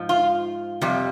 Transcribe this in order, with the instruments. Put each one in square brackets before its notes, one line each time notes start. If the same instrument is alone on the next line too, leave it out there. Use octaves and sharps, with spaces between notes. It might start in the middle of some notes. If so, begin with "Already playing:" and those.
Already playing: [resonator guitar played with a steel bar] G#2 F3
F4
F2 C3 G3